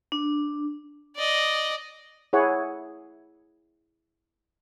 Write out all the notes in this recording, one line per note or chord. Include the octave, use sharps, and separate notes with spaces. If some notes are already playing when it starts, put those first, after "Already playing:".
D4
D5 D#5
E4 G#4 C#5 F#5